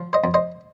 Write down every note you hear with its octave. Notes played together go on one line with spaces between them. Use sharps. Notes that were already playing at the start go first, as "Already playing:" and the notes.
Already playing: F3
C5 D#5
F2
C5 D#5